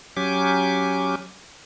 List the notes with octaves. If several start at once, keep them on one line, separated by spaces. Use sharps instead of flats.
F#3 C#4 G4 G#5 D6